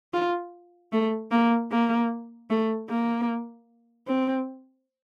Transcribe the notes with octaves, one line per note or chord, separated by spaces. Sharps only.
F4
A3
A#3
A#3
A3
A#3
C4